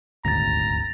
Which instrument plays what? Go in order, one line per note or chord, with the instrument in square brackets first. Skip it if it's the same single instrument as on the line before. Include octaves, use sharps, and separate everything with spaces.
[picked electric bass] D#1 G#1 D2 [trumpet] A#5 [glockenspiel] A6 A#6